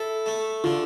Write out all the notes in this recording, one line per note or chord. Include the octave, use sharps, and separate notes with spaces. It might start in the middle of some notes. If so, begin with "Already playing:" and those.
Already playing: E4 A4
A3
D3 F4